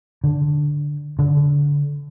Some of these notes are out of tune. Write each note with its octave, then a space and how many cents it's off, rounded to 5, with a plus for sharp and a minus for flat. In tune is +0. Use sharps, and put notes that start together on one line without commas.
D3 +0
D3 -25